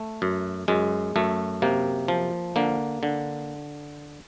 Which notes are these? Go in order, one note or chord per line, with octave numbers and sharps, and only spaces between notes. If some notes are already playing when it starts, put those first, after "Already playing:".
Already playing: A3
F#2
F#2 G#3
F#2 A3
C3 A#3
F3
D3 A#3
D3